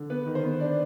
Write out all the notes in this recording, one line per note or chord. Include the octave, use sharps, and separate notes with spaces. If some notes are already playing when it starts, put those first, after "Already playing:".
Already playing: D3
B3 B4
D#3
C5
B3
D4 D5